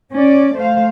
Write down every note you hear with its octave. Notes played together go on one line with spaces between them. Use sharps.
C#4 D5
A3 C5 F5